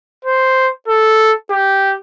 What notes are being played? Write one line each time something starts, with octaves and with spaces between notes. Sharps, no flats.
C5
A4
G4